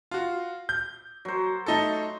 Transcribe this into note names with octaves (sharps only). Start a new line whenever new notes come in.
F4 F#4
G6
F#3 C5
A3 D#4 A4